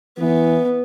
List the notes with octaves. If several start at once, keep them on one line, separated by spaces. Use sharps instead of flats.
E3 B3